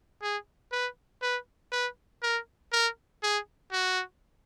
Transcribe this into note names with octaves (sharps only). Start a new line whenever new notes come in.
G#4
B4
B4
B4
A#4
A#4
G#4
F#4